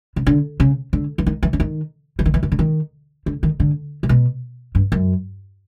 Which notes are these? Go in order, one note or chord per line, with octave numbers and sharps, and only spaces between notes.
C#3
D3
C#3
D3
E3
D#3
E3
D3
D#3
E3
D#3
E3
D#3
D3
D#3
D3
D#3
D3
A#2
B2
G2
F#2